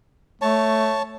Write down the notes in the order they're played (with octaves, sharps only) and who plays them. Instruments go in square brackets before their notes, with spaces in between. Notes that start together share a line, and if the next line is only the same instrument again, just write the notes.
[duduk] A3 [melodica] C#5 A5